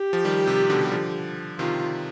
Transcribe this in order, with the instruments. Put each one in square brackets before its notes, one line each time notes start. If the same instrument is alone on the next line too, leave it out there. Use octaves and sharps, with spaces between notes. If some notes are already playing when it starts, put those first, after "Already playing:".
Already playing: [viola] G4
[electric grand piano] F3
D#3 G3
C3
C3
B2 D3
G3
D3 F3
[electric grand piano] C3 D#3 [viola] F4